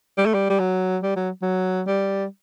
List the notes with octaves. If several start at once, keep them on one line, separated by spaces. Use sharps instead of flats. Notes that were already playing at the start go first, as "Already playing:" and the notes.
G3
A3
G3
G3
F#3
G3
F#3
F#3
G3